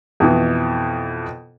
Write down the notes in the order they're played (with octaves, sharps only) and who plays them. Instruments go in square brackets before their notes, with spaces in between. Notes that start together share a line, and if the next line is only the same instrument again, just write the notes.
[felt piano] F2 B2 E3